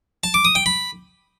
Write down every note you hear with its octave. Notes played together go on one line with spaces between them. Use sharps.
A5
D6
D#6
G5
B5